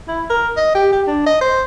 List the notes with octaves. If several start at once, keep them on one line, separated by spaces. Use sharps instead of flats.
E4
A#4
D#5
G4
G4
D4
D#5
C5